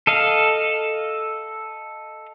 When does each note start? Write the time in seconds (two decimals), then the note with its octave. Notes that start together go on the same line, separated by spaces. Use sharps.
0.07 A4 D#5 F5